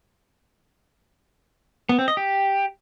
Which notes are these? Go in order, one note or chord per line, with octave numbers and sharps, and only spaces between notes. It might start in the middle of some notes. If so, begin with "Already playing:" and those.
B3
C4
D#5
G4